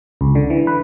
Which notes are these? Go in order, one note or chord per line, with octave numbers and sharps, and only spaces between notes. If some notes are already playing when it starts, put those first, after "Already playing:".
C#2
D3
E3
B4